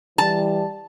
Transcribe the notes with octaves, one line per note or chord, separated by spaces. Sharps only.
E3 G3 A5